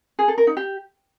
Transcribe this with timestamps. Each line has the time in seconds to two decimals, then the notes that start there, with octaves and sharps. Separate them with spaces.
0.19 G#4
0.28 A4
0.38 A#4
0.47 D#4
0.57 G4